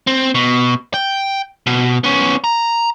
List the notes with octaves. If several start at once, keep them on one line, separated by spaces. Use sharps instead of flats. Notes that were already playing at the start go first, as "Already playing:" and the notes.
C4
B2
G5
B2
B3 C#4
A#5